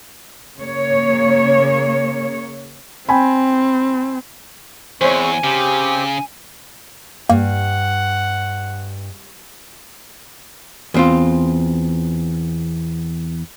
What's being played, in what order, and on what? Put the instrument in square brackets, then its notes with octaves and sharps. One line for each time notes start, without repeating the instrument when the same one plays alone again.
[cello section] C#3 A#3 C#5
[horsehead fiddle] C4 [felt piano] G5 G#5 B5
[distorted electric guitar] E2 [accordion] G#3 C4 C#6 [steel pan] C5 C#5 [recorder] G#5
[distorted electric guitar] C#3 [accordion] C4 G4
[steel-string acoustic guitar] G2 [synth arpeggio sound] A#3 [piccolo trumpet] F#5
[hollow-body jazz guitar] E2 C4 F4